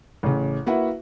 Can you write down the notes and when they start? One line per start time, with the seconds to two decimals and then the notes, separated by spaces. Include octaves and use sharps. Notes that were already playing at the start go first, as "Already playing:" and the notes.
0.23 A1 C#3
0.66 A#3 E4 F#4 B4 E5 F#5